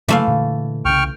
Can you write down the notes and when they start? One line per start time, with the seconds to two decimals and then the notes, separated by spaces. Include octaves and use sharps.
0.08 C#3 E3 F#3 A3 A#3 F5
0.28 A#2 D3
0.85 C2 C#3 G5 C#6 F6